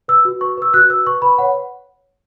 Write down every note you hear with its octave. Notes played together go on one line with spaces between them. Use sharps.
B4 E6
F#4
B4 C#6
B4 E6
F#4 F#6
B4 E6
B4 C#6
B4 B5
C#5 F#5